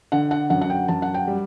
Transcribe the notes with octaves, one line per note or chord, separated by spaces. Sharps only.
D3 F#5
F#5
F#2 F#5
F#5
G5
F#2 A5
F#5
G5
G3